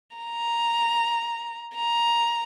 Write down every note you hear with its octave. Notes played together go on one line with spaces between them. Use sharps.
A#5
A#5